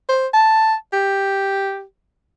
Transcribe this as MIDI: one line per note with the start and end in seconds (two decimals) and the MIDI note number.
0.09 0.27 72
0.34 0.75 81
0.93 1.83 67